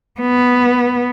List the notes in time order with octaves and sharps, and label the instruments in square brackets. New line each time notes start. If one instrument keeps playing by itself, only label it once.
[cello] B3